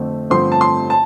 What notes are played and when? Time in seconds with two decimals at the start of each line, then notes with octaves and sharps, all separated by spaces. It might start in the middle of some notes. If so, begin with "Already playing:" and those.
Already playing: F2 D3 A3 C4
0.30 G2 D3 F3 A3 C4 C6
0.52 A5
0.61 C6
0.90 A5